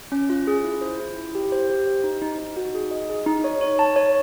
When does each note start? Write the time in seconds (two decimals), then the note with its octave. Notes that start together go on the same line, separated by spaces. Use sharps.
0.12 C#4
0.30 F4
0.47 G#4
0.64 E4
0.81 C5
1.00 E4
1.16 E4
1.35 G4
1.52 C5
1.70 G4
1.87 C5
2.04 D#4
2.22 D#4
2.39 D#4
2.57 F#4
2.75 G#4
2.91 D#5
3.10 G#4
3.26 D#4
3.44 C#5
3.61 C#5
3.79 A5
3.96 C#5